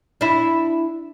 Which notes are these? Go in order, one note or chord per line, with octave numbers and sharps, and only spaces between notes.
D4 E4